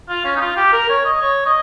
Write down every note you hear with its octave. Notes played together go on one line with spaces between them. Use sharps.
F4
C#4
D#4
F4
G4
A#4
C#5
D#5
C#5
D#5